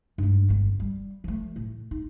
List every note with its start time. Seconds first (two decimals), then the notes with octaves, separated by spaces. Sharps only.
0.18 G2 G#3
0.49 G1 F2
0.80 G3
1.24 F3 A3
1.56 A2
1.91 D#4